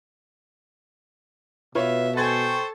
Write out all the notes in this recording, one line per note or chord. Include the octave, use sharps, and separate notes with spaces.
B2 F4 B4 C#5 E5
A4 C5 G5 G#5 C#6 G#6 A6